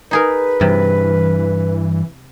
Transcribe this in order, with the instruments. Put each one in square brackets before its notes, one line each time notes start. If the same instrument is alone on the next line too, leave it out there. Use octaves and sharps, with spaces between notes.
[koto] D#4 G#4 A#4 [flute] B4
[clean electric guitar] G2 [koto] C3 [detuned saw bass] E3